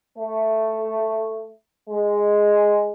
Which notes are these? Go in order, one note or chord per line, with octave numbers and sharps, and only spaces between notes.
A3
G#3